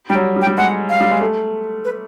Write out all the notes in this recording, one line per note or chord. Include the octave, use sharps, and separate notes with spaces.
G3 G5
F#3
G3
G5
G3
G#3 F#5
F5
G3
G#3
A3
B4